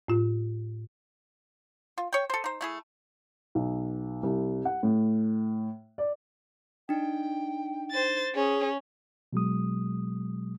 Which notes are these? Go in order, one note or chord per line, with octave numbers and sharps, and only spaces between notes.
A2 F4
F4
C#5 G5
A4 C5
D#4 C5
A3 E4 G#4
B1
C2
F#5
A2
D5
D4 D#4 G5
C5 A6
C#4 G#4
B2 F#3 G#3 D#6